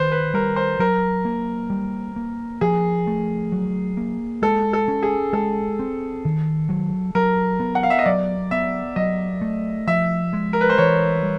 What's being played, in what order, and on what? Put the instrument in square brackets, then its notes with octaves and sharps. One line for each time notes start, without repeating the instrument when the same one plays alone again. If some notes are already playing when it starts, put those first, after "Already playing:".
Already playing: [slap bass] D#3 [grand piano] B4 C5
[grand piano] B4
[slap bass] G3 [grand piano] A#4
[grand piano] C5
[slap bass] F#3 [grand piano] A#4
[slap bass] A#3
G3
A#3
[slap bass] F3 [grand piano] G#4
[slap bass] A3
F#3
A#3
[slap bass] G#3 [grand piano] A4
[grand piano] A4
[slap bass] C#4
[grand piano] G#4
[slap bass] G#3 [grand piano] A4
[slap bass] C4
D#3
F#3
[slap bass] F#3 [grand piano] A#4
[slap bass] B3
[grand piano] F#5
F5
E5
D#5
[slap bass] F#3 [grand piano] D5
[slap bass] B3 [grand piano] E5
[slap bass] F#3 [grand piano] D#5
[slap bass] A3
[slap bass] F3 [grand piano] E5
[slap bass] G#3
[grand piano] A#4
B4
C5
[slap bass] E3 [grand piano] C#5
[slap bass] G3